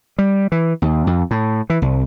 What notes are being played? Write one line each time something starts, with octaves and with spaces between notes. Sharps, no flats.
G3
E3
D#2
F2
A2
E3
C2